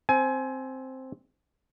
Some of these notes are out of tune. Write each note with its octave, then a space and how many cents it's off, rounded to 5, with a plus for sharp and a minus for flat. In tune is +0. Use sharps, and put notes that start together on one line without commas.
C4 +0 G#5 +25